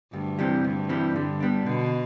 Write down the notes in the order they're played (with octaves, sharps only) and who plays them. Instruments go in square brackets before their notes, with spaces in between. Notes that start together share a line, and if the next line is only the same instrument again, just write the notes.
[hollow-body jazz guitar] D2 [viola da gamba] G2
[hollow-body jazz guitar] C3 E3 G3
[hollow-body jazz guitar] D2 [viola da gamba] G2
[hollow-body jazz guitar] C3 E3 G3
[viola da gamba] G2 [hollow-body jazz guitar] D3
[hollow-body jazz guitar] G3 B3 D4
[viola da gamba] B2 [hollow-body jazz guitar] D3